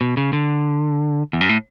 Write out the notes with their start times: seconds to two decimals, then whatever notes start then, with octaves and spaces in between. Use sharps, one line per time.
0.01 B2
0.17 C#3
0.33 D3
1.33 E2
1.41 F#2
1.49 A2